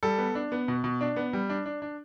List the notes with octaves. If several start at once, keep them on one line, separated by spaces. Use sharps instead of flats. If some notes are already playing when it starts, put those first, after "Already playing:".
G3 A4
B3
D4
B3
B2
B2
D4
B3
G3
D4
D4
D4